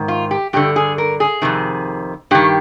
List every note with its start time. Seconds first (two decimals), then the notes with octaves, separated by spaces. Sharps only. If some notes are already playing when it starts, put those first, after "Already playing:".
Already playing: G#2 D#3
0.08 F4
0.31 G4
0.53 G2 D3 G4
0.76 G#4
0.98 A#4
1.20 G#4
1.42 F2 C3 D#3
2.31 G2 D#3 G4